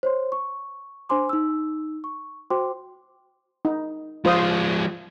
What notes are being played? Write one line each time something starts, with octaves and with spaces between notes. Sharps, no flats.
C5 C#5 C6
C#6
D4 C5 G#5 C6 D6
D#4 E6
C#6
F#4 C5 G5 C6 D6
D#4
F3 G#3 F4 C5 D#6